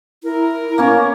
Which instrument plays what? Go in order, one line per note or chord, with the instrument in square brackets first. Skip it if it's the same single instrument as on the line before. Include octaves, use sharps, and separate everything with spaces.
[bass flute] E4 [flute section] A#4
[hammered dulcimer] A#3 C#4 C#5 [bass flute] B3